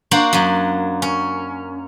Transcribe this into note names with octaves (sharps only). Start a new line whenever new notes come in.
A#3 D4 F#4 C5
F#2 F#3
C#4